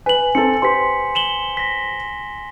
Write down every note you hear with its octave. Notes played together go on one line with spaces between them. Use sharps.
B4 G#5 F#7
C4 A4 C#7
G4 B4 C5 C6 B6
E7 F#7 G7
A#6 B6